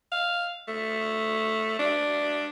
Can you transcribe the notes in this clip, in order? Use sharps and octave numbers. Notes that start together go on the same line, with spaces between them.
F5
A3
D4